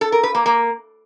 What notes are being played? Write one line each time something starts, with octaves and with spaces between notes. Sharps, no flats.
A4
A#4
B4
A#3
A#3